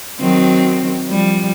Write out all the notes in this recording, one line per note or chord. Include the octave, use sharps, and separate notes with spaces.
D#3 F#3 C4
F3 G3